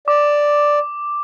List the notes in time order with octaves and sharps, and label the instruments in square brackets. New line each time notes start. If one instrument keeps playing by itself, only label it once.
[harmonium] D5 [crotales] D6